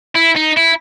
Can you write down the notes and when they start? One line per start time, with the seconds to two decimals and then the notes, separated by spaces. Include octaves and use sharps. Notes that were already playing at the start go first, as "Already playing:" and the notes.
0.15 E4
0.36 D#4
0.57 E4